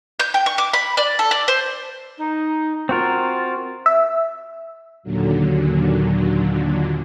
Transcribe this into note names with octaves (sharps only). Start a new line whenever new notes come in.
G6
G5
C#6
D6
B5
D5
A4
D5
C5
D#4
C4 F4 F#4 A#4
E5
D#2 A#2 D3 F#3